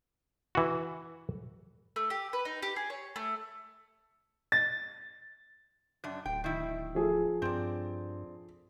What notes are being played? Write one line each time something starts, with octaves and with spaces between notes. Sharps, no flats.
E3 F#4
A3
G4
B4
D#4
G4
G#4
C#5
A3
A6
F#2 D4
D1 G5
D#3 E4
F3 G#4 A4
G2 C4 D5